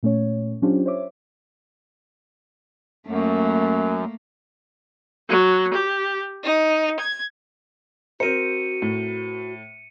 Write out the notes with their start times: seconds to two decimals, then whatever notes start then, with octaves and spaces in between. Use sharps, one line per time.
0.03 A#2 A3 C#4 C#5
0.62 F#3 C#4 D4 F4 G4 C5
0.86 C5 C#5 E5 D6
3.07 F#2 A3 A#3
5.28 F#3
5.74 G4
6.43 D#4
6.99 G#6
8.20 C4 F#4 A#4 C5 C#7 D#7
8.82 A2